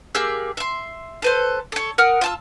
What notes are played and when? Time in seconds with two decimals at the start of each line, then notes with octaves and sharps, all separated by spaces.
0.15 A#3 G4 G#4 E6
0.57 E5 C6
1.22 A4 B4 C5
1.72 A4 C#5
1.98 A#4 F#5 D#6 F6
2.21 F4 A5 E6